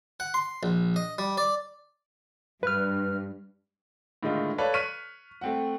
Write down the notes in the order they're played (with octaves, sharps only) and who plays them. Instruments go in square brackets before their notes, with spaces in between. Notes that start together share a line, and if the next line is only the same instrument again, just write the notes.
[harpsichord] F#5
C6
A#1
D#5
G3
D5
[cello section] G2 [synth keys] B4 F6
[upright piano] A2 D3 D#3 G#3 D#4 F4
A4 B4 C#5 D5 F5
C#6 F6 F#6 B6 D#7
A3 C4 F#5